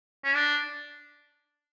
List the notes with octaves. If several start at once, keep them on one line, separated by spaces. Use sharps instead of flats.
C#4
D4